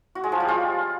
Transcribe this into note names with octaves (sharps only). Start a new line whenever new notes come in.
F#4
G#3
F3
G3
F4